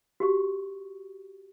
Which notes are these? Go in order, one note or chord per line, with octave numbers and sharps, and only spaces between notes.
F#4 G4 C#6